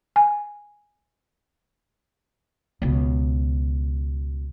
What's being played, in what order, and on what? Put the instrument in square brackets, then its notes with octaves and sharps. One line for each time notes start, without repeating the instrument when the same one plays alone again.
[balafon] G#5
[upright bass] C#2 B2